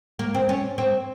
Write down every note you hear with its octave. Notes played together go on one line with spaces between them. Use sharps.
A#3
C4
C#4
C4